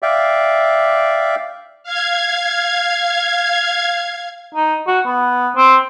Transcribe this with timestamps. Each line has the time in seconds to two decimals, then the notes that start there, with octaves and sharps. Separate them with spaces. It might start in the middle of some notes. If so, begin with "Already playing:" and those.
0.02 D5 E5 F5 G5
1.83 F5 G#6
4.55 D#4
4.88 F#4
5.06 B3
5.57 C4